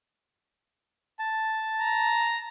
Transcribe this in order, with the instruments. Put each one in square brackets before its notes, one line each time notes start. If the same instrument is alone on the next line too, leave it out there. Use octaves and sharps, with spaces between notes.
[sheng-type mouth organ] A5
[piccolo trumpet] A#5